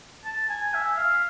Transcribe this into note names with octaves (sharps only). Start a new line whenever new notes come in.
A5
G#5
E5
F5